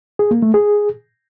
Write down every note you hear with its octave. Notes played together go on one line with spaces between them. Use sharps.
G#4
A#3
A3
G#4